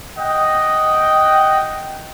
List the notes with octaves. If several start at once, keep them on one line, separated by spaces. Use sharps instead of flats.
D#5 F#5 G5